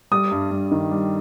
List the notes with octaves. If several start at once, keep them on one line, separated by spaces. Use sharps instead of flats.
G3 D#6
G2
G2
D#3
G3